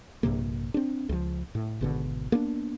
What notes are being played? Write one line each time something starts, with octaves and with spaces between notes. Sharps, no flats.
A#1 G2 C3 A#3
C4 D4
C#2 F3
A2
G#1 B2 D3
A#3 B3 D4